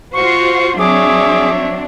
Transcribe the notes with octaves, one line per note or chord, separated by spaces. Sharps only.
F4 F#4 C5 C#6
F#3 C4 D4 G#4 C#5 E5 D6